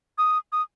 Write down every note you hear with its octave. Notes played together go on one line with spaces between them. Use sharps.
D#6
D#6